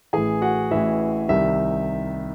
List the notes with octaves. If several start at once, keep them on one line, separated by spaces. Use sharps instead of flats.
A1 A2 E3 G#4 G#5
F#4 F#5
A1 A2 E3 E5
C2 C3 D#3 E5